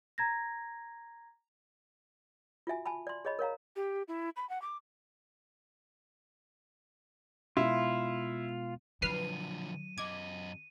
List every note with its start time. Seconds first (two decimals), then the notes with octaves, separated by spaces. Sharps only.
0.18 A#5 G#6 A#6
2.67 F4 F#4 E5 G#5
2.86 G#5 A5 B5
3.07 D5 C6
3.25 G#4 C#5 D#5 B5
3.39 A#4 C#5 F5 A#5
3.76 G4
4.08 E4
4.36 B5
4.49 F#5
4.62 D6
7.57 B2 G#3 B3 E4 F4
9.02 D3 F3 F#3 B4 F6 C7 D#7
9.98 F#2 D#5 D6 G#6